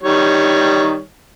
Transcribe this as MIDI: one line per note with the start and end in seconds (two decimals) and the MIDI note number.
0.03 1.02 51
0.03 1.02 55
0.03 1.02 73